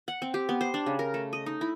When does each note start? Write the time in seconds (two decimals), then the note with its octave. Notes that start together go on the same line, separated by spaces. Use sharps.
0.08 F#5
0.22 C4
0.34 G4
0.49 B3
0.61 C5
0.74 D4
0.86 C#3
0.99 A#4
1.14 A3
1.33 D#5
1.46 D#4
1.61 E4